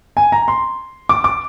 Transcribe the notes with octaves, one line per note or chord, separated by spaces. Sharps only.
G#5
A#5
C6
D6
D6